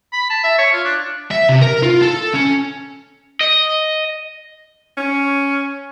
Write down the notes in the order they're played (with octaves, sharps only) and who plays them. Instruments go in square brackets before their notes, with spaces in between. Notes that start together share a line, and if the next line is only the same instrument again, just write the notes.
[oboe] B5
A5
E5
C#5
F4
D4
[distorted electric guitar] E5
C3
A#4
F4
A4
C#4
[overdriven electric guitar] D#5
[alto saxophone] C#4